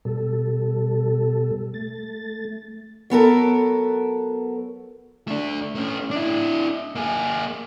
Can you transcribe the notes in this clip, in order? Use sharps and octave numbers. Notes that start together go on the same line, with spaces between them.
B2 G3 A4
A3 A6
F#3 B3 A4 A#4
A3 D4
A3 C#4
D4 E4
A#3 G#4